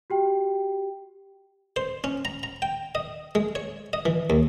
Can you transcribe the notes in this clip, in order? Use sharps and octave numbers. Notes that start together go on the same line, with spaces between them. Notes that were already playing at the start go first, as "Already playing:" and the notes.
F#4 G4 G5
C5
C#4
A#5
A#5
G5
D#5
G#3
C#5
D#5
E3
D#2